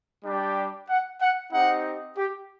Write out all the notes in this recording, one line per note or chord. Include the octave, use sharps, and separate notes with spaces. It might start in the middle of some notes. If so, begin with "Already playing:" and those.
G3 D4 G4
F#5
F#5
C4 D#4 G4 F#5
G4